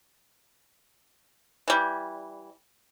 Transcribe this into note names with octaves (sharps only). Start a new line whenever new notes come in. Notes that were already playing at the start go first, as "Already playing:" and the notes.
E3 G3